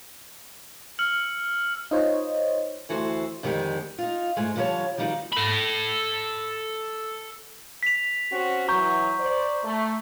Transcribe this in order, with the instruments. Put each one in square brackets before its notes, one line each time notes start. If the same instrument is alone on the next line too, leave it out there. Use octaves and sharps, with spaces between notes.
[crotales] E6 F6 C#7 F#7
[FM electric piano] D#4 F4 C5 C#5 D#5
[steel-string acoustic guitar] D2 E3 F#4 A4 C5
F2 D3 D#3 G#3 G4 G#4
D#4 F4
G#2 G#3 A3
D3 F3 G3 G#4 C#5 A5
D#3 F3 G3 D#4 F#4 D5
[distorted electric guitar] A4 B5
[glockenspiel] B6 F7
[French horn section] C4 C#4 F#4
[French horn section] E3 F#3 [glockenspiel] A#5 C#6 G6
[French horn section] C5 D5
A3